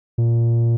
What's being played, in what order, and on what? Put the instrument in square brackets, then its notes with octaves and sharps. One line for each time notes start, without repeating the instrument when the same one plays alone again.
[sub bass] A#2